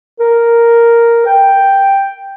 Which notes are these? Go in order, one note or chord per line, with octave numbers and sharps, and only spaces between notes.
A#4
G5